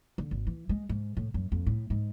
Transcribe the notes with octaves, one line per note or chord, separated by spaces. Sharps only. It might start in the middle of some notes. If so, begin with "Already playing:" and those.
D3
G#1
E3
G#3
G#2
A2
F#2
F2
A2
G#2